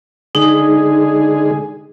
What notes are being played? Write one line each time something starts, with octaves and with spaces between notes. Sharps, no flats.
D3 G#3 D#4 G#4